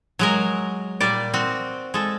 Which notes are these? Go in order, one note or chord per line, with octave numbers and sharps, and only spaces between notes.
F#3 G#3 A#4
A#2 G3 D5
C4 F#4
G#3 A4